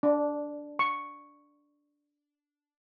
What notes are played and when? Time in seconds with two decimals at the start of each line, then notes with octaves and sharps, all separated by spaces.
0.03 D4
0.79 C#6